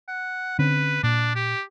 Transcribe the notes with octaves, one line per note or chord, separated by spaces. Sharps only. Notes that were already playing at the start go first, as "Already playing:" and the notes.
F#5
D3 C4 C#4 B4
A#2 D4
G4